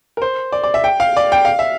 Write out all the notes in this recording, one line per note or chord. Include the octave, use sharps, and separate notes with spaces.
A#4
C5
D5
D5
E5
G5
F5
D5
G5
F5
E5